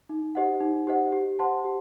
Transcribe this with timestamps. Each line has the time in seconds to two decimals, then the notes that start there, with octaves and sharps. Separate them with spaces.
0.09 D#4
0.35 G4 C5 D#5 F#5
0.60 D#4
0.87 G4 C5 D#5 F#5
1.12 G4
1.39 C5 F#5 A5 C6
1.64 G4